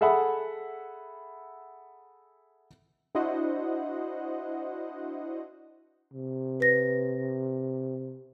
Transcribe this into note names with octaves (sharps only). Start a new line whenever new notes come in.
G#4 A4 E5 F#5 B5
D4 E4 F#4 C5 D#5 F#5
C3
B4 A#6